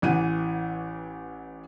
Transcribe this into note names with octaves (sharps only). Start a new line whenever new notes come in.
A1 E3 F#5 D#7